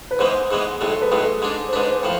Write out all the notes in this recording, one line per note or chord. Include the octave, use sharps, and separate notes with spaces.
B4
G#2 E3 G#3 B3 C5
G#2 E3 G#3 B3
B1 A2 G#3 A4
B4
B1 A2 G#3 A4
G#2 G#3 D4
C5
G#2 G#3 D4 B4
C5
A2 F3